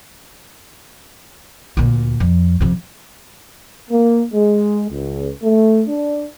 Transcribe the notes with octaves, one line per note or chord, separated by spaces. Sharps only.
D2 A#2
F2
F2 C3
A#3
G#3
C#2
A3
D4